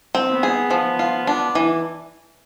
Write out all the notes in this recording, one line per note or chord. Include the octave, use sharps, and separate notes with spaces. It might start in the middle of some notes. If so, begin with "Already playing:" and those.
C4
B3
G#4
F3
F4
D4
E3